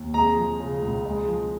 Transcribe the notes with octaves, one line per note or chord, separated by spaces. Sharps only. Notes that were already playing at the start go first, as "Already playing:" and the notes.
Already playing: D#2
G#3 A#5
F3
C#3
C#2
G#3
F3